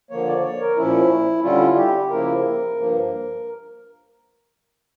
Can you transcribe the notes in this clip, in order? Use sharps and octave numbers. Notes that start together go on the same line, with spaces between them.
D3 F3 A#3 C#5
D5
C#5
A#4
A#2 F3 C#4 E4
D3 G3 C#4 E4 F4
G4
C#3 F3 A#3 E4 A#4
G2 F3 A#3